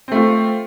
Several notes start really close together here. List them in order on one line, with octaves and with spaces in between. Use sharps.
C4 A3 F4